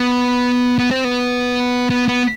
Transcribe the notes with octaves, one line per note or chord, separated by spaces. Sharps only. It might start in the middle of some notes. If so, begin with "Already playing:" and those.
Already playing: B3
B3
C4
B3
B3
B3